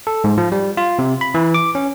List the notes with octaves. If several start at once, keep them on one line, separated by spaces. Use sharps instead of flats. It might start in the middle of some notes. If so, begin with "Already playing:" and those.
A4
G#2
F3
G3
F4
C3
B5
E3
D6
C#4